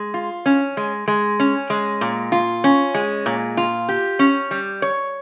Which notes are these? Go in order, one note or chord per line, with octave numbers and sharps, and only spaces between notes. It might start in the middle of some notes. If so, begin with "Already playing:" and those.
Already playing: G#3
F4
C#4
G#3
G#3
C#4
G#3
A#2
F4
C#4
G#3
A#2
F4
G4
C#4
G3
C#5